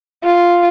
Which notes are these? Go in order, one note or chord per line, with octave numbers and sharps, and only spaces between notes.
F4